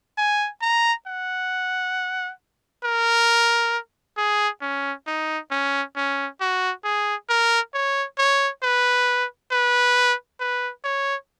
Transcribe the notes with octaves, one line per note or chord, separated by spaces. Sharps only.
G#5
A#5
F#5
A#4
G#4
C#4
D#4
C#4
C#4
F#4
G#4
A#4
C#5
C#5
B4
B4
B4
C#5